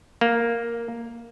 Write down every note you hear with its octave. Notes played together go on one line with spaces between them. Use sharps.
A#3